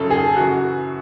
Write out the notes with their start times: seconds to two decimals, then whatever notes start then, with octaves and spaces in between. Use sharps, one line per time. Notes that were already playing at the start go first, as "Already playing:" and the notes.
Already playing: F#2 C#3 F#3 A4
0.10 G#4
0.36 F#2 C#3 E3 F#4